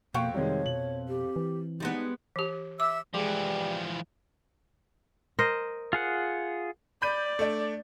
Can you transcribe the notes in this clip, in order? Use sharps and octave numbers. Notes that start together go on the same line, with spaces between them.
F2 B2 A#3 F5 G5 C#6
C3 D#3 G3 G#3 C#5
B2 F#7
G4
E3
G3 G#3 B3 D#4
E3 G4
E5 D6 E6
E3 F3 G3 G#3 G#4 D6
A#4 C5 D#5
F4 G#4 F#5
D5 B5 G6 D#7
A3 D4